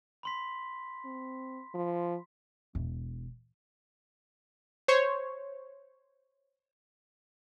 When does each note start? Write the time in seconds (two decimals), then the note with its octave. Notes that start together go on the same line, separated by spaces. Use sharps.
0.23 B5 C6 B6
1.05 C4
1.74 F3
2.75 E1
4.88 C5 C#5